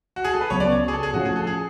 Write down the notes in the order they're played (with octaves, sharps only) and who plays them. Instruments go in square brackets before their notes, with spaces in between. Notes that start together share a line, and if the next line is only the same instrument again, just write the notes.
[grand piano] F#4
G#4
A4
B4
[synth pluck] C#2 C#3 F#3 B3 [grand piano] C#5
[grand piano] D5
C#5
G#4
A4
G#4
[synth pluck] A2 F3 A3 C#4 F4 [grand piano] F#4
[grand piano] G#4
A4
G#4